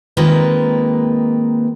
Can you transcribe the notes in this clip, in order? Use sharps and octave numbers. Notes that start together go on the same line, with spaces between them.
D#3 G#3 A#3 C4 F4 B4